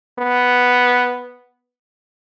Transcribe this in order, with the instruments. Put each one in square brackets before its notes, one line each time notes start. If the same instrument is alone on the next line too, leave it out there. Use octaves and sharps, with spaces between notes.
[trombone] B3